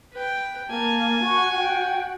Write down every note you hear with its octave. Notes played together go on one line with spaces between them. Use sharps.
B4 G5
A#3 G#5 A5
F#4 F#5 C#6
G5